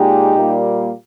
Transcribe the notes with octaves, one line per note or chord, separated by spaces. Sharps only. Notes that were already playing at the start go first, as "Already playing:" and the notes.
Already playing: A#2 G#3 D#4 G4
A#2 G3 A#3